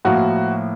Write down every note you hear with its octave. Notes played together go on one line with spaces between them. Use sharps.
A2 F3 A#3 F#4